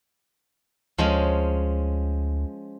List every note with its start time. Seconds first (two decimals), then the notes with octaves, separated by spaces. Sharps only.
0.98 D2 F3 G#3 C#4